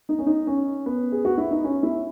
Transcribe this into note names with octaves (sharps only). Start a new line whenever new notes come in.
D#4
C#4
D#4
C#4
B3
G#4
F#4
E4
D#4
C#4
E4